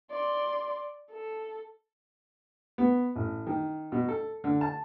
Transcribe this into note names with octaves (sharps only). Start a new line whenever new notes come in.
D5 C6
A4
B3
A1
D#3
B2
A4
D3
A5